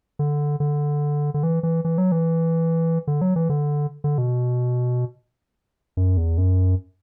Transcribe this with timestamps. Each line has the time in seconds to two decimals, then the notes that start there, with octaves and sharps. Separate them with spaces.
0.19 D3
0.60 D3
1.34 D3
1.43 E3
1.63 E3
1.85 E3
1.98 F#3
2.12 E3
3.07 D3
3.21 F#3
3.36 E3
3.49 D3
4.04 D3
4.18 B2
5.97 F#2
6.17 E2
6.38 F#2